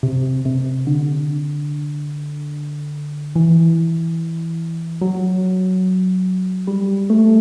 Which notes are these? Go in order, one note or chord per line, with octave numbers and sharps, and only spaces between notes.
C3
C3
D3
E3
F#3
G3
A3